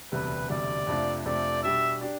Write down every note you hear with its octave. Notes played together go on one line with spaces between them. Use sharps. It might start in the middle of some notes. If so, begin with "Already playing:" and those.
E1 D2 C3 G3 B4
E1 D2 C3 G3 D5
F2 C3 F3 A3 D4
F2 C3 F3 A3 D4 D5
B2 G3 D4 G4 D5 E5
D4 G4 D5